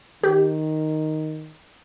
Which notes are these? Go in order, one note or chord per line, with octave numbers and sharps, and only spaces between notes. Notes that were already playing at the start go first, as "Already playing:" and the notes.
D#3 G4